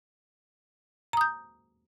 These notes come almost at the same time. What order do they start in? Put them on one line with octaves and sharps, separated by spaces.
A#5 D#6 G6